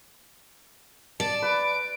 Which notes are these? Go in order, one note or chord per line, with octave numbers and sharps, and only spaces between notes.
D5 A5
B4 D7